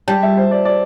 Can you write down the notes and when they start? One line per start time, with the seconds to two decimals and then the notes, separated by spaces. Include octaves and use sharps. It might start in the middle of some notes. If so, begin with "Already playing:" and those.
0.08 G3 A5
0.23 E5
0.37 C5
0.51 D5
0.65 D5